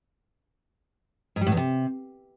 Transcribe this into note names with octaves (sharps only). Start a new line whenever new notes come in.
G#2
G3
A2
E2
C3